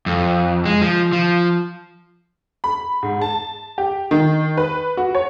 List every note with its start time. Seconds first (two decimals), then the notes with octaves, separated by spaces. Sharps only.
0.06 F2
0.65 G#3
0.82 F3
1.13 F3
2.64 B5
3.03 G#2
3.22 A5
3.78 G4
4.11 D#3
4.58 B4
4.97 F#4
5.15 C#5